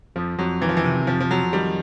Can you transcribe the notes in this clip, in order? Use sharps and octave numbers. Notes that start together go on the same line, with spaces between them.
F2 F3
F2 F#3
D#3 E3
F3
E3
C3
F2 F3
F3
F2 F#3
D#3 G3